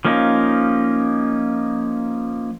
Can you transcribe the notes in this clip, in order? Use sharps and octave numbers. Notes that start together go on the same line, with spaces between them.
F3 A#3 C#4 D#4